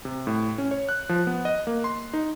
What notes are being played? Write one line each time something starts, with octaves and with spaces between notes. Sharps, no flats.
C3
A2
C#4
C#5
F#6
F3
B3
D#5
A#3
C6
D#4